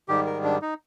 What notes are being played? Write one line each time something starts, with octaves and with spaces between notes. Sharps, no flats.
G#2 D#3 G3 G4
A#4
D4
D#4